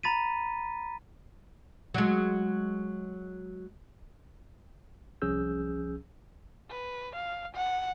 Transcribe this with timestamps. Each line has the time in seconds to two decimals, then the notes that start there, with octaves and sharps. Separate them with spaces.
0.03 A#5 B5 A6 B6 D#7
1.94 F#3 G#3
5.22 C2 F3 C#4 G#4 E6 G6
6.70 B4
7.16 F5
7.55 F#5